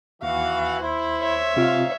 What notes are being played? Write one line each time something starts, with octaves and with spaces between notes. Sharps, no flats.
D#2 E3 F#4 F5
E4 C5
C#5 E5
G#2 C3 C4 F4 F5